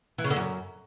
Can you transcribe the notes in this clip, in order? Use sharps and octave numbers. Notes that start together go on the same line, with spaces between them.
E3
C#3
D3
F#2